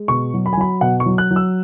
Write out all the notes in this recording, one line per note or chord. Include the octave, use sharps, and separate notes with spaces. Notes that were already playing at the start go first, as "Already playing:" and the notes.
Already playing: G#3
B2 C#6
F#3
B5
G#5
F#3 B5
B2 F#5
C#6
F#3
F#6
F#3
E6